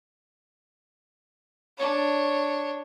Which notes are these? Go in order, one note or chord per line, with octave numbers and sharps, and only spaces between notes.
D4 C#5